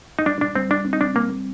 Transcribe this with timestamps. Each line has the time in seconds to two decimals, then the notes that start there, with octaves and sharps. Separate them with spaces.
0.19 D#4
0.26 G3 D4
0.41 D4
0.56 G3 C4
0.71 D4
0.86 C4
0.93 D#4
1.01 D4
1.16 A#3 C4